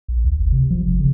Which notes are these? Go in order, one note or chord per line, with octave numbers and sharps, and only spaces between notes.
A#1
D2
G1
C3
F3
F#1
C#3